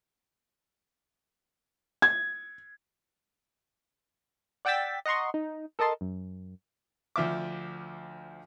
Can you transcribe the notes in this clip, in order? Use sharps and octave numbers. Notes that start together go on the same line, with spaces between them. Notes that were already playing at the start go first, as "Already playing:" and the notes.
G#6
D5 F#5 G5 E6 A6 B6
D#5 F#5 A#5 C6 C#6
D#4
A4 A#4 D#5 A5 C6
F#2
D2 F3 E5 D6